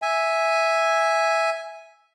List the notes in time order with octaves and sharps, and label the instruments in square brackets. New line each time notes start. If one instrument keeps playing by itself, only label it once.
[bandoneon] E5 G#5